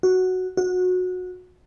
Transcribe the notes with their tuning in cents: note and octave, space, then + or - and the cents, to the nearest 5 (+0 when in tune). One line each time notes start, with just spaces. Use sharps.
F#4 +0
F#4 -20